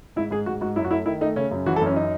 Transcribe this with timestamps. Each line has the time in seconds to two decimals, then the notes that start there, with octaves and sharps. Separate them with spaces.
0.16 G#2 E4
0.31 G#2 G#4
0.46 G#2 F#4
0.61 G#2 F#4
0.76 F#2 E4
0.84 F#4
0.91 A3 E4
1.06 D#3 E4
1.21 A3 D#4
1.36 C#3 C#4
1.51 F#2
1.66 E3 F#4
1.76 A4
1.81 F#2
1.86 C#4
1.96 D#4